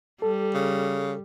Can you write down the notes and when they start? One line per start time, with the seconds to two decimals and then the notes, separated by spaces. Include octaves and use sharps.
0.22 G3 A4
0.54 C#3